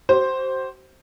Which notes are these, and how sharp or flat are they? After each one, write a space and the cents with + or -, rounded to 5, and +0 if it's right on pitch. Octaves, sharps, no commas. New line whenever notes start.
F#4 +45 C5 +5